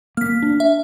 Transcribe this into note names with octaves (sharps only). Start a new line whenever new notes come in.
A#3 F6 B6
D4
E5